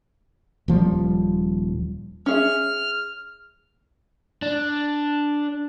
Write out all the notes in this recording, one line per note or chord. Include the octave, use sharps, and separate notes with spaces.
D#1 F3 G3
C#4 G#4 E5 F6
D4